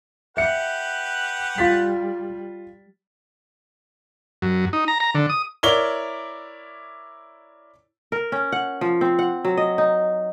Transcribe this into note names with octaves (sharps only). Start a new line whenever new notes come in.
G4 B4 E5 F#5 C#7
G3 F4 A6 B6
F#2
D#4
A#5
A#5
D3
D#6
E4 A#4 C#5 D5 G7
A#4
C#4
F#5
F3
C4
F#5
F#3
D#5
D#4